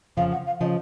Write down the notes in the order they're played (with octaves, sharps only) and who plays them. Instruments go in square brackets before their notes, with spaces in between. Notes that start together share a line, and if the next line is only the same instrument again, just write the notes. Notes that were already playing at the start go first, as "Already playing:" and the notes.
[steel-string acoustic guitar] F2 C#3 F3 [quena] F5
[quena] F#5
F5
[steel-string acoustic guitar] C#3 F3 [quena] D#5